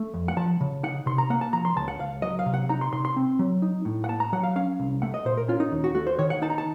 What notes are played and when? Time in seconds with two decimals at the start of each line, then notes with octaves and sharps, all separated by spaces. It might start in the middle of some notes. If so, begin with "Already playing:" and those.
Already playing: A3
0.14 F2
0.28 F#5
0.37 F3 A5
0.61 C#3
0.83 D#4 F#5
1.06 C3 C6
1.18 A#5
1.30 A#3 F#5
1.41 A5
1.53 F3 A#5
1.65 C6
1.76 C#2 A5
1.88 F#5
2.00 C#2 F5
2.22 F#3 D#5
2.39 F5
2.46 C3
2.54 F#5
2.69 D#4 A#5
2.81 C6
2.93 C3 C6
3.05 C6
3.16 C4
3.39 F#3
3.62 D#4
3.85 A2
4.04 F#5
4.08 A#3 A5
4.20 A#5
4.32 F#3 F#5
4.43 F5
4.56 C#4 F5
4.80 C2
5.02 A3 F#5
5.14 D#5
5.25 A#2 C5
5.37 A#4
5.48 C#4 F4
5.60 D#4
5.71 D#2
5.84 F#4
5.95 A3 F#4
6.07 C5
6.19 D#3 C#5
6.30 F#5
6.42 D#4 A5
6.50 A#5
6.58 A5